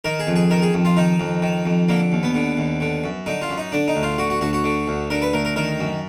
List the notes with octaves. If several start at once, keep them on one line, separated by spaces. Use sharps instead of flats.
D#3 A#4
G#4
F2
G#4
D#3 A#4
G#4
F2
F4
D#3 D#4
F2
D#3
F2
D3 A#3
D#2
B3
D3
D#2
D3
F#2
D3 D#4
F4
F#2
D#4
D3 D4
D#4
D2
F4
D3 F#4
F#4
D2 F#4
F#4
D3
D2
D3 A#4
B4
D2 A#4
A#4
D#3 A#4
F#2